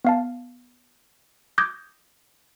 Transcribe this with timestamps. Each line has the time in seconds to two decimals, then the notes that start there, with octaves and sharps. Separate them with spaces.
0.05 B3 F5 A5
1.58 D6 D#6 G6 G#6 A#6